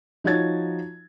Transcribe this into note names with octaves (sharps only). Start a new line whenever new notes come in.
F3 D#4 F#4 C#5 G#6 A6